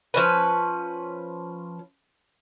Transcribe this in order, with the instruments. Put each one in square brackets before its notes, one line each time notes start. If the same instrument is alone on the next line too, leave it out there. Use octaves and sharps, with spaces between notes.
[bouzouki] F3 C#4 B4